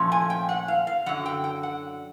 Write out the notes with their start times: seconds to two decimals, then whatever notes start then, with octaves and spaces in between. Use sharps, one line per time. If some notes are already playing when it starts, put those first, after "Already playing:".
Already playing: A#2 F3 A3 C#4
0.12 G#5
0.30 G5
0.49 F#5
0.68 F5
0.87 F5
1.06 F#2 D3 F#3 F#5
1.26 G5
1.44 G5
1.63 F#5